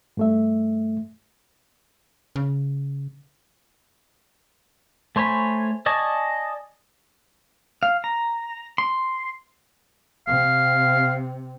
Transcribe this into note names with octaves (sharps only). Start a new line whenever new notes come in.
G2 A3 E5
C#3
A3 C5 C#5 G#5 B5
D5 D#5 G#5 A5 C#6
F5
A#5
C6
C3 F5